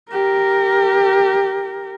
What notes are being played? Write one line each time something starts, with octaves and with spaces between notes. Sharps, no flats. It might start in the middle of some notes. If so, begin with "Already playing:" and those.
G4 A#4